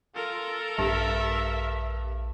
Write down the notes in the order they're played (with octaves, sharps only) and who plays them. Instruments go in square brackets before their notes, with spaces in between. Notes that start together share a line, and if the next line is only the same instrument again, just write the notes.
[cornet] F4 [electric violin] A4 A#4
[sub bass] A#1 [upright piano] G2 [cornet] E5